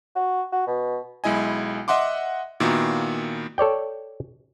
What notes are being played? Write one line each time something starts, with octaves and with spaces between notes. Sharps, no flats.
F#4
F#4
B2
B1 G#3 E4 D#5 G#5
D#5 E5 F#5 C6 D6
A#2 D#3 A#3 B3 E4 F#4
A4 C#5 D5 G5